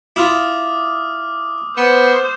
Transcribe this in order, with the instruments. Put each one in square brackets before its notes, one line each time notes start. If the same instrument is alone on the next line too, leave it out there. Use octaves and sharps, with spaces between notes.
[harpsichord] E4 F4 [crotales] D6 D#6 F6
[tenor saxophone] B3 [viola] C5 [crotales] E7